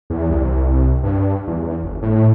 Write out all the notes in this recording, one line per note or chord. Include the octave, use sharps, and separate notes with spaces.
E2
C2
G2
E2
G1
A2